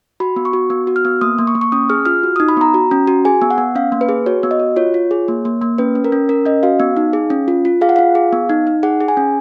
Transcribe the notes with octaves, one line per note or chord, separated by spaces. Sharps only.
F#4 B5
B3
C#6
F#4
B3
F#4
F6
B3
A#3 D#6
A#3
C#6
A#3
C#6
C#4 D#6
G#4 F6
F4 F6
F#4
D#4 D#6
B5
B3 A#5
F#4
C#4
F#4
G#4 G#5
B3
F#5
B3
C#4 F5
A#3
B4
G#4
F#4 C#5
B3
D#5
F#4
F4 C#5
F4
G#4
A#3
A#3
A#3
C#4 B4
C#4
A#4
C#4
C#4 A#4
C#4 D#5
F#4 F5
B3
D#4
G#4
C#4
F4
F4
G#4 F5
F#5
F4 F5
G#4
B3
D#4
D#4
G#4 F#5
G#4
G#5
C#4